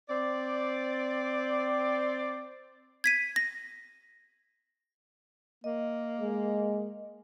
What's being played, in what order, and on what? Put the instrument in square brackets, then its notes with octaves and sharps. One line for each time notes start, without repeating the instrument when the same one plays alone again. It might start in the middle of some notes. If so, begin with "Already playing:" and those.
[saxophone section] C4 D5
[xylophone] G#6 B6 D#7
A#6
[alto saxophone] A#3 [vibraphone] D#5
[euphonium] G#3